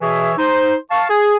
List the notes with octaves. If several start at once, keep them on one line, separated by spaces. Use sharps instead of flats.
B2 E3 G#4 C#5 E5
D#4 C5
F5 A5 C#6
G#4 G#5